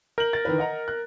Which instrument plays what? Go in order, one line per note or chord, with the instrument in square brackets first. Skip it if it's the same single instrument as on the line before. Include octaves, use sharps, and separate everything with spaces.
[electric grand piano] A#4 [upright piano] G6 F#7
[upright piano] A6
D#3 E3 B4
D#5 F#5 A#5
F#6